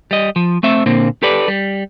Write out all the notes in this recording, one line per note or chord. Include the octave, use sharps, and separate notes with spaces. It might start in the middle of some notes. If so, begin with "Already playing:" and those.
G3 D#5
F3
A3 C4 E5
A#2 D3 A#3 C4
G4 A4 B4 D5
G3